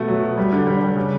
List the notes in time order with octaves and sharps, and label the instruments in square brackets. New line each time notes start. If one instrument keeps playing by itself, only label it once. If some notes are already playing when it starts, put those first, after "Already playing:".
Already playing: [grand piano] B2 A3 B3
F#3
B2
G3
D3
G3
G3
C#3